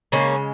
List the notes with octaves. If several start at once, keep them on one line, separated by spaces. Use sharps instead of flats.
C#3 G#3 A#3 C#4